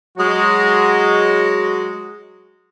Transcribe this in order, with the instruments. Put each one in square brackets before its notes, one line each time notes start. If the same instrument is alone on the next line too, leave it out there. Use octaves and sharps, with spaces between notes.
[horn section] F#3 G#3 F#4